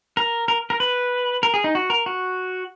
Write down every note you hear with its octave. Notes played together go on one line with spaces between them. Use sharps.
A#4
A#4
A#4
B4
A#4
G#4
D#4
F#4
A#4
F#4